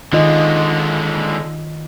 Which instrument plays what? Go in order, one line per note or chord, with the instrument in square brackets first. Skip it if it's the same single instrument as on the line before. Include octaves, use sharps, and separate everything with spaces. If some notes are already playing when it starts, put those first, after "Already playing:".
[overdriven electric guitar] D3 G#3 [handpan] D#3 F4 D#5